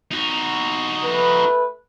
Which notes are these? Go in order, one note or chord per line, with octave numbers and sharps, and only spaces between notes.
D#4 F#4
A3 B4